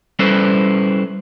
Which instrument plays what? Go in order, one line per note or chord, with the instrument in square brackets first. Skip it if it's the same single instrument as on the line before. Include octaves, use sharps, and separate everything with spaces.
[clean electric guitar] G3 C#4 E4 A4 B4 C5